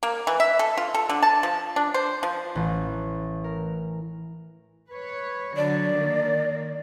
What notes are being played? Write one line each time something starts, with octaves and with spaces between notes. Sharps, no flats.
A#3
E3
E5
A4
F4
A4
D3
A5
F3
D4
C5
F3
A1
A#4
B4 C#5
D3 F#3 D5
D#3 A#3